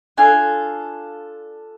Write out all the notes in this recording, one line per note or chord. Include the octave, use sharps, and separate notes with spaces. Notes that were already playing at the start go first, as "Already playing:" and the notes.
D4 F4 A4 G#5